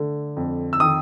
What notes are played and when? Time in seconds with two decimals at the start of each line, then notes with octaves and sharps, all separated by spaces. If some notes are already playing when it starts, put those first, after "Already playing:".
Already playing: D3 A3
0.37 F2
0.73 E6
0.80 D#3 D#6